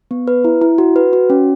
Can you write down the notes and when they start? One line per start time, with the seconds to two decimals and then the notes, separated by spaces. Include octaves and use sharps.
0.11 B3
0.28 B4
0.44 E4
0.61 E4
0.78 F#4
0.96 B4
1.13 F#4
1.30 C#4